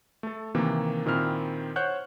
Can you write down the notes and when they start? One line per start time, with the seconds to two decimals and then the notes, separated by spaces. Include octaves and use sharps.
0.23 A3 A4
0.55 C3 D#3 E3 A#3
1.06 A#2 D#3 C4 E4 F6
1.76 C5 C#5 F#5 F#6 G6